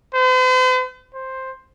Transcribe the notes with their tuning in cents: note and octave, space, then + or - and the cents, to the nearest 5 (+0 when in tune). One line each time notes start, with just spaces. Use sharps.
C5 -45
C5 +5